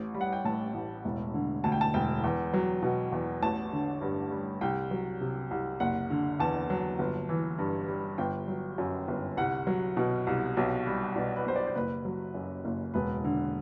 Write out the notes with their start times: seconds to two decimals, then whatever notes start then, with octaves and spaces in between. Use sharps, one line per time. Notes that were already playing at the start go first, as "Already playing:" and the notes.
Already playing: A1
0.14 G3
0.21 F#5
0.33 G5
0.45 A2 A5
0.74 A1
1.05 E1
1.34 D3
1.64 D2 A5
1.72 G5
1.81 A5
1.94 E1 G5
2.24 E2
2.54 F#3
2.82 B2
3.12 E2
3.42 A1 A5
3.73 D3
4.01 G2
4.31 G3
4.61 C2 G5
4.91 F#3
5.21 C3
5.51 C2
5.80 F#1 F#5
6.10 D3
6.40 E2 A5
6.70 F#3
6.99 G1
7.29 E3
7.58 G2
7.88 G3
8.18 G1 G5
8.48 F#3
8.78 F#2
9.08 G1
9.37 C2 F#5
9.67 F#3
9.97 B2
10.27 C2
10.57 B1
10.87 G3
11.16 B2 D5
11.36 B4
11.46 B1 C5
11.56 D5
11.67 C5
11.75 F#1 B4
12.05 F#3
12.35 F#2
12.65 F#1
12.94 E1 B4
13.24 D3